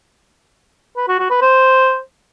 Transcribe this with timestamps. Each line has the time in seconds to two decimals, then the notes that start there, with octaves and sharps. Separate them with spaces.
0.97 B4
1.08 F#4
1.19 F#4
1.30 B4
1.42 C5